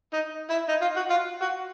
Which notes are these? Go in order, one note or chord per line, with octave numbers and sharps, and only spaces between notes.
D#4
E4
D#4
F4
F#4
F4
F#4